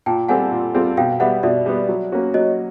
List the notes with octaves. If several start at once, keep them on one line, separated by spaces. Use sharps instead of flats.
A#2 G5 A5
G3 C4 F4 A4 F#5 G#5
A#2
G3 C4 F4 A4
B2 F5 G5
G3 B3 E5 F#5
B2 D5 E5
G3 B3
F#3
A#3 C#4 F#4
F#3 C#5 D#5